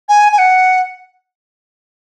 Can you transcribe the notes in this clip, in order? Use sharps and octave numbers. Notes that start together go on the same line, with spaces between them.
G#5
G#5
F#5